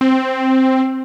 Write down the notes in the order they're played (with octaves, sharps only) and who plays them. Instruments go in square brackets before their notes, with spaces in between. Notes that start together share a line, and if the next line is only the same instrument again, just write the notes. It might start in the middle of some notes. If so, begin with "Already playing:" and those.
[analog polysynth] C4